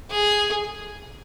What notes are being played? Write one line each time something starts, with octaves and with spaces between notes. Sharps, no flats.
G#4